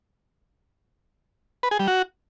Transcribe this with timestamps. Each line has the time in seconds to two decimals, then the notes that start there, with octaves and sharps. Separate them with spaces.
1.63 B4
1.71 G#4
1.79 G3
1.88 F#4